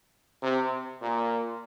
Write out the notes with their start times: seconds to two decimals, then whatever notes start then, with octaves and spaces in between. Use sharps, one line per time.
0.43 C3
1.02 A#2